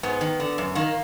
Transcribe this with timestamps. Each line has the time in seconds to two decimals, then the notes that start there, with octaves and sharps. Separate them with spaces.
0.03 G#2 B3
0.21 D#3
0.40 D3
0.58 F#2
0.75 D#3 A#3